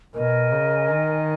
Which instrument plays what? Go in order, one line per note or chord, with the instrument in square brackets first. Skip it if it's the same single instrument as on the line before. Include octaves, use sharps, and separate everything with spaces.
[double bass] B2 [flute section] A#4 D#5 G#5
[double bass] C#3
D#3